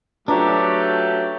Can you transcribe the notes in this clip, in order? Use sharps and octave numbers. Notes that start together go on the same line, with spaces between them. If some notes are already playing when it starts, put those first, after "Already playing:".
F#3 A3 D4 F4 G4 B4 A#5